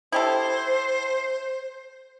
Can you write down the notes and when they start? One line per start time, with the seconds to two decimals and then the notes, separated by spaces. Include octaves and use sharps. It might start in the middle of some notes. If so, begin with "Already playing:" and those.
0.12 E4 G4 A4 C5